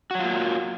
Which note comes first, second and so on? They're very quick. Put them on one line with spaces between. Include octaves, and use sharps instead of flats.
F#4 F#3 F4 A#3